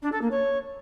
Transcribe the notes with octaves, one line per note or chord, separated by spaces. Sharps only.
D4
A4
A#3
C#5